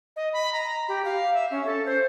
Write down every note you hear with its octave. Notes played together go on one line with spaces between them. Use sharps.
D#5
B5
A#5
G4
F5
E5
C#4
A4
C5